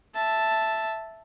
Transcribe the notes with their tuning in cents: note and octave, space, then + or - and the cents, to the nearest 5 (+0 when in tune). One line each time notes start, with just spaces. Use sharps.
E5 +0 A5 +0